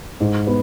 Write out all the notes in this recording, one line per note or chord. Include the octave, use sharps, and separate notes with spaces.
G#2
B3